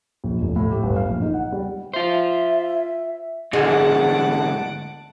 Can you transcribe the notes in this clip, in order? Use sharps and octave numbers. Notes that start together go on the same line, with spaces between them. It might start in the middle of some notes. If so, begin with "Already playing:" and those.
A#1
F1
A2
G4
G1
F5
A#1
D#4
F#5
G3
F4 C5 E5
D2 G#2 G#4 D#5 F#5 A5 D7